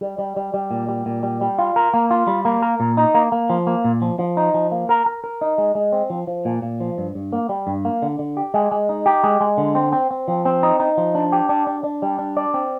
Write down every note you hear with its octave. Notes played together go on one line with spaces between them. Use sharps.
G3
G3
G3
G3
A#2
G3
A#2
G3
G3
F4
A#4
A#3
F4
G3
A#3
A#4
A#2
D#4
A#3
A#3
F3
A#3
A#2
F3
F3
D#4
F3
A#3
A#4
A#4
A#4
D#4
G#3
G#3
C4
F3
F3
A#2
A#2
F3
G2
G2
A#3
G3
G2
A#3
D3
D3
G4
G#3
G#3
D#4
G4
G#3
G#3
D3
C4
C4
C4
F3
C4
D#4
D#4
F3
D4
G4
D4
D4
D4
G3
D4
D5
C4